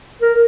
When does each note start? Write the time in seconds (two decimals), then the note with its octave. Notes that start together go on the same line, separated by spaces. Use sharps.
0.22 A#4